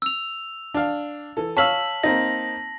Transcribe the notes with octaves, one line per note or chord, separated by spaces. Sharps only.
E6 F7
D4 F5
E3 A4
C#5 F5 A5 E6 B6 F#7
A#3 C4 D#4 A#6